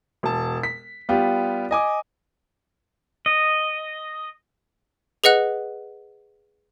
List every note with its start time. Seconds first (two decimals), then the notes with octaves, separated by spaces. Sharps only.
0.23 E1 A5
0.63 B6
1.09 G3 B3 F4 G4
1.71 D#5 G#5 D6
3.26 D#5
5.24 G#4 B4 D#5 F#5 F#6